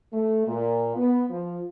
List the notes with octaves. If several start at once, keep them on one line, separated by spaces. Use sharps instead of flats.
A3
A#2
B3
F3